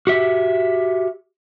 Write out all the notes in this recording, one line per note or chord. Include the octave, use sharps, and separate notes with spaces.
F#4 G4 E5